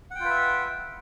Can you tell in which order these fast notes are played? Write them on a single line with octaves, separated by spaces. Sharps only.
F#5 G5 F4 B4 E5